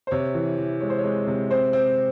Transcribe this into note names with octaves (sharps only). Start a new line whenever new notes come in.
C5
C3 C#5
E3
E3
G#3 C#5
C5
C#5
G#3
C3
C4 C5
C4